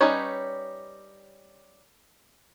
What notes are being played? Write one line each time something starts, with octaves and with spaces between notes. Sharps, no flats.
G3 C#4 D#4 B4 C#5